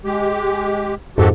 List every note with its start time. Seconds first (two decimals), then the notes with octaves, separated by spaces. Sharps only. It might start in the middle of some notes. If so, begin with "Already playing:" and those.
0.05 G#3 G4
1.18 F2 G#2 F#4 G4 A4